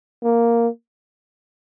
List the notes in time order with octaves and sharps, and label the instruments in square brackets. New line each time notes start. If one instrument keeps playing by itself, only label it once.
[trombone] A#3